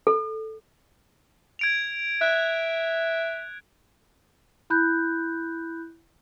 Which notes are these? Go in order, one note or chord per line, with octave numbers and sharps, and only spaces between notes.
A4
G#6 D7 F7
E5 F#6
E4 B5 F#6 G6